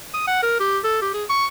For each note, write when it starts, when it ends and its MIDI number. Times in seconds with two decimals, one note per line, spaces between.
0.14 0.25 87
0.28 0.39 78
0.42 0.56 70
0.60 0.79 67
0.84 1.00 69
1.02 1.11 67
1.13 1.24 68
1.29 1.47 85